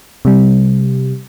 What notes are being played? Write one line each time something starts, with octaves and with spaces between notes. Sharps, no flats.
C3 G3